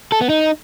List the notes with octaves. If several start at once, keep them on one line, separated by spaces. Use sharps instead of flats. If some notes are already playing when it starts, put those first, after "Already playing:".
A4
B3
D#4